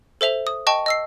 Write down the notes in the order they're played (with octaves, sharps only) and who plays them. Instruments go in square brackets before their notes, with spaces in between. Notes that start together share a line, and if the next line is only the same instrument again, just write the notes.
[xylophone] A4 C5 E5 F7
D#6
D#5 G5 A5 C#6
D#5 E6 C7